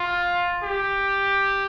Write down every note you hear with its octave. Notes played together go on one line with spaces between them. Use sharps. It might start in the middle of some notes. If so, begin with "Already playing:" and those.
Already playing: F4
G4